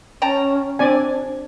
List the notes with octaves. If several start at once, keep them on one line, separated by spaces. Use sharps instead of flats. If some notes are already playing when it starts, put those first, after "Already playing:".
C#4 G5 A5 A#5
C4 D4 D5 G#5